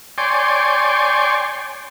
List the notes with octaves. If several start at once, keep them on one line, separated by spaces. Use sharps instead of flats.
C#5 D5 G5 G#5 C6